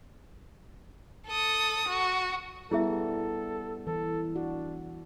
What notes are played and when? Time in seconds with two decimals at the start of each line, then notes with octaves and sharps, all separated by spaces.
1.27 A4 D#6
1.88 F#4
2.71 G3 B3 E4 G#4 A4 E5
3.87 E3 A4
4.36 D4 F#4